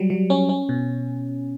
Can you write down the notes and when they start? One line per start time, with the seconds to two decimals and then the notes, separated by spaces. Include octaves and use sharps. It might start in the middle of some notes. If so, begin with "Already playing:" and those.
Already playing: F#3 G3
0.10 F#3
0.30 C#4
0.49 C#4
0.69 B2